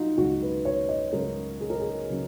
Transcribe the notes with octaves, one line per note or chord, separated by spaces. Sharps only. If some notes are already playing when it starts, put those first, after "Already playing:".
Already playing: F#3 D#4 F4 F#4
C#2 C#3 F#3 F#4
B4
C#5
D#5
C#2 C#3 F#3 A#4
G#4
A#4
G#4
C#3 F#3